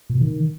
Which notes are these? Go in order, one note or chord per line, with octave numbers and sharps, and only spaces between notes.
A#2
B2
D#3